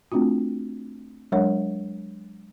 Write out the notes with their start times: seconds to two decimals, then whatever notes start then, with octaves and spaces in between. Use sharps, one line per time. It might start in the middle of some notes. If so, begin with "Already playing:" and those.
0.12 A3 C4 D4 F4 F#4
1.32 F#3 G#3 D4 A#4 C#5 F#5